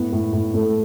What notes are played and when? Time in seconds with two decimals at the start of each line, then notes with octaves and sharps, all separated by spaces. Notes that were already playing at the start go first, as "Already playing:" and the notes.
Already playing: A2 B3
0.12 A2
0.33 A2
0.54 A2 A3